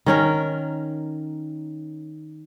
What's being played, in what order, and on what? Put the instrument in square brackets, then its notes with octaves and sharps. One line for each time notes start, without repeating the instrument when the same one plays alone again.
[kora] D#3 C#4 A#4